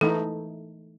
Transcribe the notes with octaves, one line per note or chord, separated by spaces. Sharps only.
E3 A3 D#4 A4